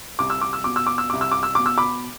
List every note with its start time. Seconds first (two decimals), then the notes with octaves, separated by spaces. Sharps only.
0.19 C2 D6
0.30 E6
0.41 D6
0.53 E6
0.64 B2 D6
0.76 E6
0.86 D6
0.98 E6
1.10 C2 D6
1.21 E6
1.31 D6
1.43 E6
1.55 B2 D6
1.66 E6
1.78 B5 D6